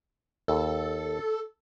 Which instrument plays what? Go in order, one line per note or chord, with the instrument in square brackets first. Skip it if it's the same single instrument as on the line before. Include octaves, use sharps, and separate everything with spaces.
[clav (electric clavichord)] D#2 [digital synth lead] A4